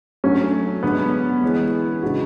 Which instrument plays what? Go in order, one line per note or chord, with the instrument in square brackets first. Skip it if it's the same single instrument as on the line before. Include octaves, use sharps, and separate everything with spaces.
[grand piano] F#3 A3 D4 F#4 [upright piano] C#4
[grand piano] D3 G#3 D4 [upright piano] B3
[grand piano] E3 G#3 C#4 G#4
C#3 G#3 D4 F#4